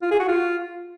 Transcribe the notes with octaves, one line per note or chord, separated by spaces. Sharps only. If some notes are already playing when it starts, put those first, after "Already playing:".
F4
G#4
F#4
F4